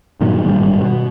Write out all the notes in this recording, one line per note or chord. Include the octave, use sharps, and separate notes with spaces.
G2 A#2 D#3 F#3
G#1 G2 G3
B2